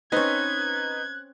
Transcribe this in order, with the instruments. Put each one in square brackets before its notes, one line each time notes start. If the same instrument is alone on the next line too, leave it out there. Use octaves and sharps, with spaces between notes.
[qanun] C4 C#4 [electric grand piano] D#4 B4 D#5 [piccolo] F#6 [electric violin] G#6